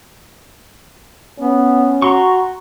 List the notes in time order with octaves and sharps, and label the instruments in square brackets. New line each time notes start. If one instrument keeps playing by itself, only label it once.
[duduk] B3 [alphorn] C#4
[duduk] F#4 [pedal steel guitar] A#5 C6 C#6